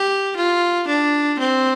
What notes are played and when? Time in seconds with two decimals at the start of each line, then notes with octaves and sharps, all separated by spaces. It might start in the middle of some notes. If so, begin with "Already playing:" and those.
Already playing: G4
0.36 F4
0.87 D4
1.39 C4